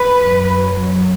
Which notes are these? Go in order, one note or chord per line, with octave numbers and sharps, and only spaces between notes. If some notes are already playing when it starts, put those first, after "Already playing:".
Already playing: B4
F#2 F#3